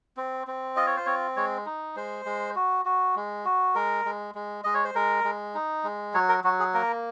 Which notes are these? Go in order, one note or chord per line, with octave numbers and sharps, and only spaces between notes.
C4
C4
F4 D#5
C#5
C5
C4 C#5
G#3 C#5
D#4
G#3 C5
G#3
F#4
F#4
G#3
F#4
G#3 A#4
G#3
G#3
G#3 D#5
C#5
C5
G#3 A#4
G#3
D#4
G#3
F#3 C#5
A#4
F#3 F#4
G#4
A#3 A#4